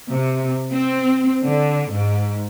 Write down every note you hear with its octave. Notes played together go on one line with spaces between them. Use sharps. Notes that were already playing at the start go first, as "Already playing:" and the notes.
C3
C4
D3
G#2